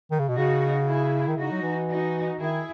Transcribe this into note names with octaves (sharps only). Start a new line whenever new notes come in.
D#3
C#3
B2
C#3 D#4 F#4
E4 G#4
D#3
C#3 D#4 F#4
F#3
E3
D#4 F#4
D#3 E4 G#4